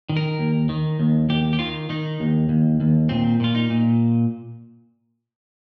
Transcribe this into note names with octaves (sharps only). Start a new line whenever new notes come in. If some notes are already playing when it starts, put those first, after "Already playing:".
D#3
A#4
D#2
D#3
D#2
D#2 G4
G4
D#3 F4
D#3 D#4
D#2
D#2
D#2
A#2 C4
A#2 F4
D#4
A#2